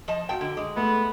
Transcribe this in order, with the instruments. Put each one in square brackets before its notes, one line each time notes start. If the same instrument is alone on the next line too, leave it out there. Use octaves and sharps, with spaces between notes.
[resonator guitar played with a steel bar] F3 D#5 A5
[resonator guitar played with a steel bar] A#2 G5 [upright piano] F#4 A5
[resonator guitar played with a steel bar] D3
[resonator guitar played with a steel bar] G#3 [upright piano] D6
[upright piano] A3 [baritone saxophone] B3